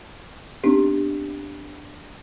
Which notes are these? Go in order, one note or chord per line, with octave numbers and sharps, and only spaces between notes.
B3 C4 D4 D#4 G4